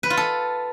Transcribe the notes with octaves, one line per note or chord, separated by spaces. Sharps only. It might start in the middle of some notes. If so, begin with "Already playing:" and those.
B4
F4
A4